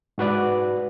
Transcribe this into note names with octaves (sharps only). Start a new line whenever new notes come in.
G#2 F#4 B4 D5